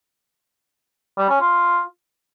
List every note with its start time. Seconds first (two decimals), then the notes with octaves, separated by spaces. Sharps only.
1.18 G3
1.29 C#4
1.41 F4